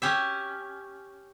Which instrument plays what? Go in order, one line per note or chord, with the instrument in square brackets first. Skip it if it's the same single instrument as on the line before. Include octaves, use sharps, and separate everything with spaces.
[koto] C#4 G4 E5